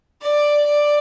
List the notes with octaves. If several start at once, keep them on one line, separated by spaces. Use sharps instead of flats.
D5
D5